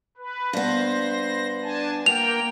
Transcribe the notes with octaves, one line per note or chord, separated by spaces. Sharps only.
B4
G2 B3 C5 A#6
D4 G#5 A5
A#3 A#4 G5 F7